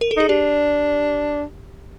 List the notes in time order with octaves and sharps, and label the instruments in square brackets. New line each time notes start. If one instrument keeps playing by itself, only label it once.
[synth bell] A#4
A4
[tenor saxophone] D#4 [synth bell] G#4
[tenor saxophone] D4 [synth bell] G4